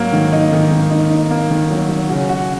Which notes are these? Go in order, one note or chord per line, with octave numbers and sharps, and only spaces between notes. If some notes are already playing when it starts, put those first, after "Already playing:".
Already playing: G#2 F#3 A#3
D#3
D#4
D#3
A#3
D#4
D#4
A#3
D#3
F#3
F#3
C#3 F#4
F#4